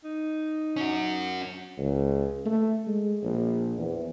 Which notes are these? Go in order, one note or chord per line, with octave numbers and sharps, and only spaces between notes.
D#4
C#4 F#4
C#2
A3
G#3
A#1
E2